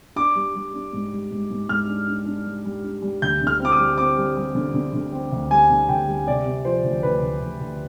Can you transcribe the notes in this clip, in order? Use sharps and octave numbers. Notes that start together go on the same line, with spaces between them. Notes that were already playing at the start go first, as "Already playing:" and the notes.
D4 D6
G3
G3
D4
G#2
G3
G#2
G#2
G#2 F6
D4
D4
D4
G3
G3
D4
G3
D2 G6
D3
F6
C4 D6
D#6
G3
C4 D6
G3
G3
D3
D3
D3
C4
D2
G3 G#5
D3
D2 G5
G3
C3 D5
C3
F3 C5
D2
D2 B4
D2
D2
D2